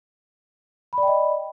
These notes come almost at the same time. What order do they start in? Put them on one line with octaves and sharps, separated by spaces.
B5 D5 G5 D#5